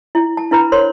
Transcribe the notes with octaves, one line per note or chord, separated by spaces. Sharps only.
E4
A5
D4 E4 B4 A#5 B5
A#4 C5 C#5 C6